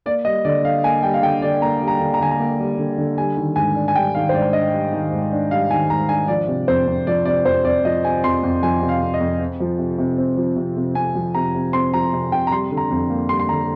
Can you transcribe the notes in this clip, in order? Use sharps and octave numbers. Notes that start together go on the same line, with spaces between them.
A#3 D5
G3 D#5
D3 D5
D3 F5
A#3 G#5
G3 G5
F5
D3 G5
D3 D5
A#3 A#5
G3
A#5
D3
A#5
D3 G#5
A#5
A#3
G3
D3
D3
G3 G#5
D#3
G#2 G#5
D4
G#5
G3 G5
D#3 F5
C5
G#2 D5
D4 D#5
G3
D#3
G#2
D4
G3 F5
D#3 G#5
G#2 A#5
D4 G#5
F3 D5
C3
F2 C5
F2
F3 D5
C3 D5
F2 C5
F2 D5
F3 D#5
C3 G#5
F2 C6
F2
F3 G#5
C3
F5
F2
D#5
F2
C4
F3
C3
C3
C4
F3
C3
C3
C4 G#5
F3
C3 A#5
C3
C4 C6
F3 A#5
C3
C3 G5
A#5
G3 C6
D3
A#5
F2
A#3
G3 C6
C6
D3 A#5